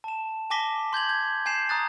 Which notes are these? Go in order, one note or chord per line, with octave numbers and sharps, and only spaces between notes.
A5 E7
G#5 A5 D6 A#6 B6 G7
C6 G6 G#6 F#7
G6 G#6
G#5 G6 C7 E7
A#5 D#6 F#6 A6